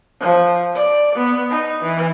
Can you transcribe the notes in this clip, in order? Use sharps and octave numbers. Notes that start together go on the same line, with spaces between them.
F3
D5
B3
D#4
E3